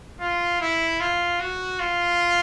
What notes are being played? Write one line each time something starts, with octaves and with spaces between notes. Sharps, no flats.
F4
E4
F4
F#4
F4